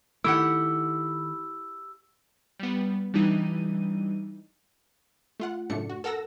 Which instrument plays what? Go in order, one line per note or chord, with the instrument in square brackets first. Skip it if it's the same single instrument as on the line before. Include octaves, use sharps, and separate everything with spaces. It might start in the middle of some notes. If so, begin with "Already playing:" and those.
[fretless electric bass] D#3 A3 [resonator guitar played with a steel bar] E4 G4 F#5 [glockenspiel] E6
[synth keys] G3 B3
E3 G3 D4 D#4 D#7
[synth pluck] A3 F4 F#5
F#2 A2 C#3 A3 D4 C#7
F#4
A4 A#4 F#5 E6 A#6